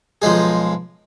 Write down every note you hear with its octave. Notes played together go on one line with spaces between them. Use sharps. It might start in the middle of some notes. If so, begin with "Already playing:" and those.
B1 F3 G#3 G#4